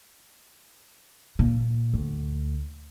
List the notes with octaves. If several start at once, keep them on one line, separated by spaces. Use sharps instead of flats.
A#2
D2